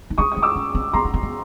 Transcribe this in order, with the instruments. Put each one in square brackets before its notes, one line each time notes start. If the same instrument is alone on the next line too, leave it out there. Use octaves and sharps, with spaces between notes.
[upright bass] D#4
[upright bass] D4 [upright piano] C#6 D#6
[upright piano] D#6
[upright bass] C#4
[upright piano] D6 E6
[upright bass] C#4
C4
[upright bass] B3 [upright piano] A#5 C6
[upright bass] C#4
C4
B3